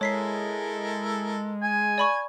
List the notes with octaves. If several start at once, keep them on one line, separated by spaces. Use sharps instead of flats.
G#3 E4 A4 A#4 C#5 B6 C7
G#5
D5 B5 C#6